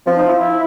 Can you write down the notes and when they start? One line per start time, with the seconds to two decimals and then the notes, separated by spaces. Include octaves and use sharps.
0.06 F3 C4
0.16 D#4
0.27 E4
0.37 E4